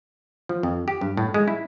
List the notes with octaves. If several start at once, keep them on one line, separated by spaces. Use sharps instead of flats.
F3
F2
G4
G2
A2
G#3
E4